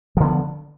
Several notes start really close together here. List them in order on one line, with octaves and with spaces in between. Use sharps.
F3 D3 B3